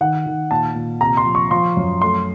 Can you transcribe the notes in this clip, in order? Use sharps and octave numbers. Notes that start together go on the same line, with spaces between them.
D#3 F#5
D#3
A#2 A5
A#2
C3 A#5
C6
F3
C#6
F3 C6
F#2
A3 C6